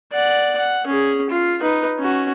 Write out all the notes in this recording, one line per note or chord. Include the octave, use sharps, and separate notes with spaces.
D5 F#5
F#5
C#4 G#4
F4
D#4 B4
C#4 F#4